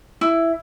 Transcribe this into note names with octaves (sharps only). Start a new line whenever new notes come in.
E4